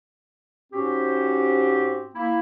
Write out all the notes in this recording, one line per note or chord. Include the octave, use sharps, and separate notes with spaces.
G#2 C4 C#4 F#4 G4
A#3 E4